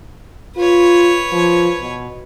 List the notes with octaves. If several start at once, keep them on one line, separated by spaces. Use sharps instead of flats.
F4 B4 C#5
F3
B2